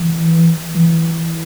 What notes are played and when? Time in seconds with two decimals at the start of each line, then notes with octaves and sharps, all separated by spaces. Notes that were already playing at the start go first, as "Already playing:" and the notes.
Already playing: E3
0.75 E3